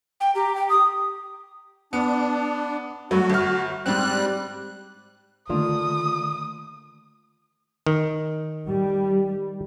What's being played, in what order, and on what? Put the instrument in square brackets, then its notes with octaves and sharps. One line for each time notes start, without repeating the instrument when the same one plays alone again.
[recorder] G5
[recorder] G4 [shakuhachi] A#5
[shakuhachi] G5
D#6
[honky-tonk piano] B3 [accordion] D4
[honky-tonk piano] G2 F#3 A3 [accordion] F#4
[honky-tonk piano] G1 F6
[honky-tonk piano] G#2 C4 [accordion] G3 F#6
[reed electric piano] D3 D#3 A3 [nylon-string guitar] A#3 D4 F4 [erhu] D#6
[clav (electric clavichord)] D#3
[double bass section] G3